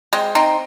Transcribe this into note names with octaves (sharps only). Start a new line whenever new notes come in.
G#3 C4
C4 D#4